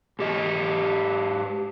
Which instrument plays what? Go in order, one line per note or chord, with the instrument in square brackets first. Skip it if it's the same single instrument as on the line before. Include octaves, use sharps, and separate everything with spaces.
[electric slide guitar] G#2 G4 D#5